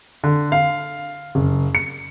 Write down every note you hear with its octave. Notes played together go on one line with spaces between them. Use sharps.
D3
F5
F#1
C#7